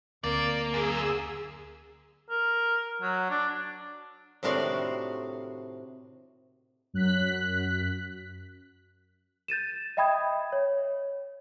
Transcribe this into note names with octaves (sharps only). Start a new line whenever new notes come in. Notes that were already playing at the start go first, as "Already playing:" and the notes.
D2 A#3 C4 D5
F#2 G#4 E6
A#4
F#3
D4
A2 C3 D#3 D4 F#4 F5
F#2 F#6 B6
G6 A6 D#7 E7
D#5 E5 G5 B5 D#6 G#6
C#5